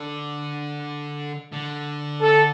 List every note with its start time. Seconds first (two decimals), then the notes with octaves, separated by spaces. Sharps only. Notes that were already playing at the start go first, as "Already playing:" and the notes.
Already playing: D3
1.52 D3
2.21 A4